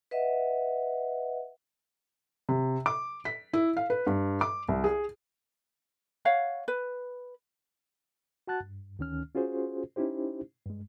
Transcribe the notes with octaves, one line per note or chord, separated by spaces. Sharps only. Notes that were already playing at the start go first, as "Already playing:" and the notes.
B4 D#5 E5 F#5
C3
D6
B6
E4
F5
B4
G2
D6
C2
G#4
C#5 F5 F#5
B4
F#4 F#5 A5 F#6 A6
G2
D2 D#3 C#4 F6
C#4 F4 F#4 G#4 C5
C#4 D#4 E4 G4 C5
G2 G#3